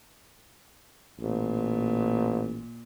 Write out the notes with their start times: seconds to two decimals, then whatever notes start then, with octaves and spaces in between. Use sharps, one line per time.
1.20 A1 A#2